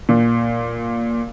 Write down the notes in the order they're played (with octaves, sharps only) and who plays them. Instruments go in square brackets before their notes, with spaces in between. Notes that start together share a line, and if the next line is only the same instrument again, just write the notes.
[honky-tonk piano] A#2